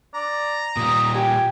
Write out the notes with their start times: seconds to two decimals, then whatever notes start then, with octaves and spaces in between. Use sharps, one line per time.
0.14 D5 A#5
0.77 A#2 G3 D#6
1.15 G4 G#5